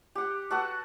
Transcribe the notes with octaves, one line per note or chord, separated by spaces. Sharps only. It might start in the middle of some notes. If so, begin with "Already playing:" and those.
G4 F#5
F#4 A4 B4 F#5